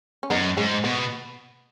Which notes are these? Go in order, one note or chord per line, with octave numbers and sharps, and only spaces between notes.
C#4
F#2 B3 D#4
G#2 G#3 C#4
B2 B3